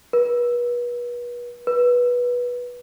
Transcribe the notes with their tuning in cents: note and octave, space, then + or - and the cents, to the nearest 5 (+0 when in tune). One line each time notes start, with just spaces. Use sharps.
B4 -35
B4 -15